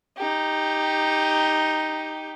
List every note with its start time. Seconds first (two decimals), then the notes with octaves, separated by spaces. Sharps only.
0.17 D#4 G4